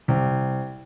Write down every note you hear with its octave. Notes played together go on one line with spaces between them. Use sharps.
C2